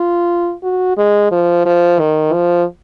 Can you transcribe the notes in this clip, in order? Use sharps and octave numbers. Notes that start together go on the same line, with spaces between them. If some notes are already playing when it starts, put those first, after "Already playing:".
Already playing: F4
F#4
G#3
F3
F3
D#3
F3